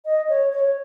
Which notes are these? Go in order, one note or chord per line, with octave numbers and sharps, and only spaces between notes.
D#5
C#5
C#5